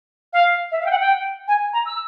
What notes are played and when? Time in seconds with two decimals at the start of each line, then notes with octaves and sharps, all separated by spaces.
0.33 F5
0.71 E5
0.81 F5
0.86 G5
0.90 F#5
1.00 G5
1.48 G#5
1.73 A#5
1.86 E6